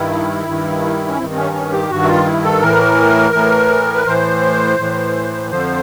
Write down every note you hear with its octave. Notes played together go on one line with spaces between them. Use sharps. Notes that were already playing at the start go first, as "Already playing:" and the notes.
Already playing: G2 D#3 E4
G2 D#3
C#4
G2 D#3 C4
C4
C#4
C#4
G4
G2 D#3 F#4
E4
F4
E4
A4
A2 E3 A#4
A2 E3
B4
A2 E3 C5
A2 E3
F2 D3 F3 C5